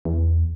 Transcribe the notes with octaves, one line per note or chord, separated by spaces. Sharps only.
E2